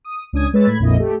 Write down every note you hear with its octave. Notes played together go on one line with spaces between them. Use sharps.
D#6
C#2 C#4 D4 D#6 G#6
G#3 B4 C#5 E6 A6
A2 B5 G#6
A#1 F2 A#2 E4 D#5
A3 G4